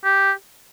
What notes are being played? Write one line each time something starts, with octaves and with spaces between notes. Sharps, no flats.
G4